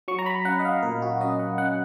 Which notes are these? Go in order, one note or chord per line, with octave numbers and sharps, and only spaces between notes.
F#3 C#6
A#5
B5
C#4 F#5
D#5
F5
A#2 A#4
F#4
C#4 D#5
F#5
C#4 F#5